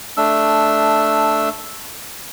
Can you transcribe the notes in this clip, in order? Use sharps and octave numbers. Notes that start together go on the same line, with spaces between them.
A3 D4 E6